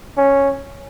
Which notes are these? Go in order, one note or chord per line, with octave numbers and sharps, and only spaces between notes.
C#4